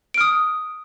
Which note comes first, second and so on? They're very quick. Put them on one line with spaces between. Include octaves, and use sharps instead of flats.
D7 F6 D#6